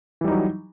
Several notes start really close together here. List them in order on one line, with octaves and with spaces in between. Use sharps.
E3 G3 D#4 F#3